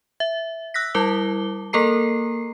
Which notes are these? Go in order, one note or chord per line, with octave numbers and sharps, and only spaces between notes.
E5
E6 F#6 A#6 B6
G3 E4 A#4 A5 D6 G7
A#3 A4 A#4 A#5 C7